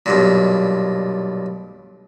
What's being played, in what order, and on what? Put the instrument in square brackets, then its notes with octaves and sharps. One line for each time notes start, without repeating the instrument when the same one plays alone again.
[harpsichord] B1 G2 A#2